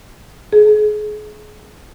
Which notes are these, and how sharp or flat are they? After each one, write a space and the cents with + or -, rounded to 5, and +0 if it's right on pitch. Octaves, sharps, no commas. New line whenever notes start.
G#4 +30